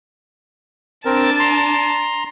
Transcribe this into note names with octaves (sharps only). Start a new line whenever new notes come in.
C4 D4 A#4 A5
A#5 C6